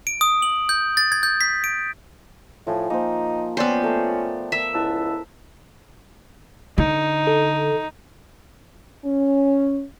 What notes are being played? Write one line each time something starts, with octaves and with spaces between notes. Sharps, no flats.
D7
D#6
F#7
G6
A6
G#6
G6
B6
D7
A2 F3 G#5
A#3 D#4 C5
B3 C#4 F4 C5 D5 G5
A3 A#4
A#4 E5
C#2 E4 A5 E6
D3 D#4
A4
C#4